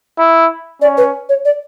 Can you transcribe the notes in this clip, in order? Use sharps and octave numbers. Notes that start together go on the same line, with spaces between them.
E4
C#4 D5
B4
C#5
D5